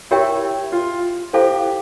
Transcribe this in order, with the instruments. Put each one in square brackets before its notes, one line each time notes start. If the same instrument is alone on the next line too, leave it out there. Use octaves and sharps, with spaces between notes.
[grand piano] E4 [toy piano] G4 A#4 C#5 E5 G5
[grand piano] F4
[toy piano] E4 A4 C5 F5 [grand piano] G4